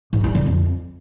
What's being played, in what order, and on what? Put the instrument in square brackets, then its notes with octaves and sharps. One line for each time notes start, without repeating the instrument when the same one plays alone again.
[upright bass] G#2
G3
D3
F2